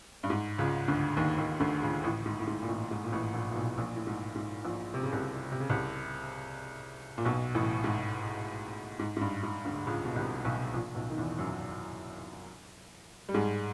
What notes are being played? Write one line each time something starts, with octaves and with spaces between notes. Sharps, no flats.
G2
G#2
C#2 C#3
D2 D3
D#2 D#3
D#2 D#3
D2 D3
C#2 C#3
A1 A2
G#2
A2
G#2
A#2
A1 A2
G#2
A#2
A1 A2
A#1 A#2
A#2
B1 B2
A#1 A#2
A2
G#2
G#2
A#1 A#2
C3
C#3
C2 C3
C3
C#3
C2 C3
A#2
B1 B2
A1 A2
G#2
G#2
G#2
G2
G#2
D2 D3
C#2 C#3
B2
C2 C3
B1 B2
A#1 A#2
B1 B2
D#3
E2 E3
F#2 F#3
G3
G#2 G#3